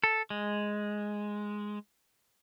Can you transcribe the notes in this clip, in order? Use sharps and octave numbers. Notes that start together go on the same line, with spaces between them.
A4
G#3